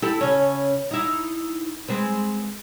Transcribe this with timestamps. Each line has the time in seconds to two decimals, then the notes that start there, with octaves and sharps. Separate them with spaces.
0.02 E4 G4 A4
0.21 C#3 C#4
0.91 D#4 E4
1.88 G#3 C4 B4